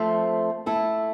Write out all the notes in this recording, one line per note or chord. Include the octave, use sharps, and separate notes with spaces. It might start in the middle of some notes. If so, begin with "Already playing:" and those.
Already playing: F3 A3 C4
A3 E4 A4